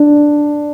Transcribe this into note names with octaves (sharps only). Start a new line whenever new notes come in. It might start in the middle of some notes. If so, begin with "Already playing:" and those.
Already playing: D4